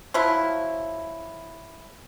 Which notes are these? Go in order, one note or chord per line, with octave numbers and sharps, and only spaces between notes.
F3 F#3 E4